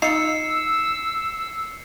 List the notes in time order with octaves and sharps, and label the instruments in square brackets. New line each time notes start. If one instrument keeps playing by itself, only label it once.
[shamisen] D#4 F4 F5 [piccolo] E6 [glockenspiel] C7 C#7